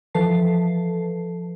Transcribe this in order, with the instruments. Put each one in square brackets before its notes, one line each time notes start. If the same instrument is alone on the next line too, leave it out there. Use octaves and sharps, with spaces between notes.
[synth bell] E3 F3 A4 B4 A5 C7